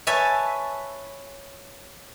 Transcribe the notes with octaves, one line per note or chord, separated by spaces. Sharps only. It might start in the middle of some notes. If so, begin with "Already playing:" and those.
B4 C#5 E5 G#5 A5